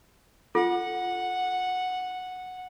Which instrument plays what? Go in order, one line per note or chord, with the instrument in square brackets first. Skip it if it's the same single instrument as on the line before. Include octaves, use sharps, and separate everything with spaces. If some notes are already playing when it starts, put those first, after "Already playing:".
[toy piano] F4 A4 [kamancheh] F#5